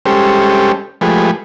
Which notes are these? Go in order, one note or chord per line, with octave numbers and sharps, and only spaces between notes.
G3 G#3 C#4 G4 A4 C5
F3 G#3 A3 G4 G#4 B4